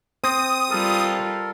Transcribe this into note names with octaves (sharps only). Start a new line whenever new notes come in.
C4 D#6
G3 F4 A4 A#4